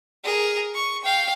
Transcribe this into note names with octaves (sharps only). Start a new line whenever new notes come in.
G#4 A#4
C#6
F5 G5